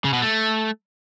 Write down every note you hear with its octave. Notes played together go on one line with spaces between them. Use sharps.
C#3
B2
A3